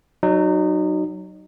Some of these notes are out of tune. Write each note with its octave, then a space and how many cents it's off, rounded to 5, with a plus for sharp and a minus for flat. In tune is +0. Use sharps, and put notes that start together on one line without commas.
F#3 +10 D#4 -25